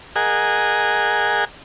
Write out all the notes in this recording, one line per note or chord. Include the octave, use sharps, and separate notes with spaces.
G#4 A#4 D#5 F#5 G#5